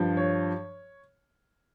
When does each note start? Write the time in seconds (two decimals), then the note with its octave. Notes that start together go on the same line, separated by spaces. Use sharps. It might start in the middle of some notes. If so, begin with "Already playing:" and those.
Already playing: G2 F3
0.17 C#5